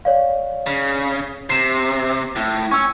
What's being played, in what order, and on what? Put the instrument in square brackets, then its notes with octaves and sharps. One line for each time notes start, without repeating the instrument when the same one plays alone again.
[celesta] C#5 D5 F5
[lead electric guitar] C#3
[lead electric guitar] C3 [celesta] C7 E7
[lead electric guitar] A2
[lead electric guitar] C#4 [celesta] C#6 E6